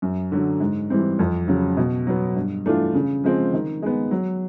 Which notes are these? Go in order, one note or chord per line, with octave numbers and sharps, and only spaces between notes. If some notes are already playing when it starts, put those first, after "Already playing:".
F#2
D3 F#3
G#2
E3 G3 C4
F2
C#3 F#3
B2
F#3 B3
G2
E3 A3 D4 F4
C#3
F3 G#3 C4
D#3
G#3 B3
F#3